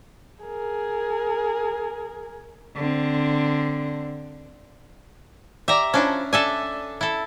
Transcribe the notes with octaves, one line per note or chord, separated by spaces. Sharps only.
G#4 A#4
D3 C4
G4 D5 E5 A#5
F3 C#4 D4 E4
D4 A4 E5 G#5
E4 A4